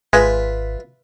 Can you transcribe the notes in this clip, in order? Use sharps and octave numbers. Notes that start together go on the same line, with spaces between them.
G#1 G#3 F4 B4 E5